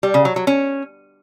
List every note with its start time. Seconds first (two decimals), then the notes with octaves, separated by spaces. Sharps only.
0.03 G3
0.14 C#3
0.25 F#3
0.36 F#3
0.47 C#4